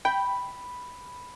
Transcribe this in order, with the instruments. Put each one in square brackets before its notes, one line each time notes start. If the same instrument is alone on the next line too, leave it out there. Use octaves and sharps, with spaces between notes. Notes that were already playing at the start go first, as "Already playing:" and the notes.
[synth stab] G5 [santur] B5